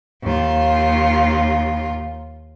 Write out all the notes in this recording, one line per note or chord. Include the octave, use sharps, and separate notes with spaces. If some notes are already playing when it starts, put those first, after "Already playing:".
D#2 F4